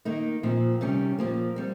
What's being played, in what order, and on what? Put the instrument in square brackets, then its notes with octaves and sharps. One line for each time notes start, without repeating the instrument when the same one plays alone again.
[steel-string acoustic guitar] D#3 A#3 D#4
A#2 F3 C4
C3 D#3 G3 C#4
A#2 F3 A#3
G3 C4